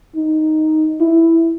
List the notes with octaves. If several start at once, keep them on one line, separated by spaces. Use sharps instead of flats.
D#4
E4